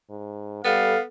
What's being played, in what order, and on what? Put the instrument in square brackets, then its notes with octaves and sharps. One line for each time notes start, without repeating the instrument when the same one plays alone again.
[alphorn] G#2
[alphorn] G3 [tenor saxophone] B3 [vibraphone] A4 [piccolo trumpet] F5